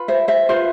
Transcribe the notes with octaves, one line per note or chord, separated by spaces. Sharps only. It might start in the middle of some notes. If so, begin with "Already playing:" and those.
Already playing: F4 B4
C5 E5
C5 E5
F4 B4 C5 E5